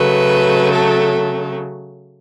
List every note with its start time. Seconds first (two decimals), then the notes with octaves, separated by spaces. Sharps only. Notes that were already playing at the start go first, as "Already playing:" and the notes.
Already playing: C#3 F#3 A3 B4
0.73 A4